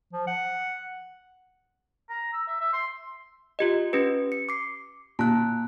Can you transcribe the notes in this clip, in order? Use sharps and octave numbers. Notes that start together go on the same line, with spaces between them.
F3
F#5
A#5
E6
E5
E5
C6
F4 G4 D#5
C#4 G4 B4
C#7
D6 C7
A#2 A5 F#6